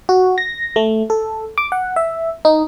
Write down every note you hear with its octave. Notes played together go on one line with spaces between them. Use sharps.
F#4
A#6
A3
A4
D6
F#5
E5
D#4